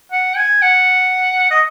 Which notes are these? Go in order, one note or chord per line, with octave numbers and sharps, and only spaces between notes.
F#5
G#5
F#5
D#5